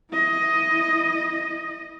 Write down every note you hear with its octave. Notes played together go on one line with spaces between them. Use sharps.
E4 D#5